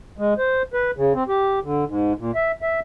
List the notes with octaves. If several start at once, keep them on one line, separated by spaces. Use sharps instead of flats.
G#3
C5
B4
C#3
C4
G4
D3
G#2
A#2
E5
E5